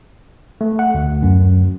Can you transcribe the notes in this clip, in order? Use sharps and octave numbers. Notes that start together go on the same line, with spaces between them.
A3
F#5
D2
F#2